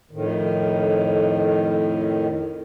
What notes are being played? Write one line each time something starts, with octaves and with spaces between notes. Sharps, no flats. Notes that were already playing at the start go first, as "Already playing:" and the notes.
F2 A2 D#3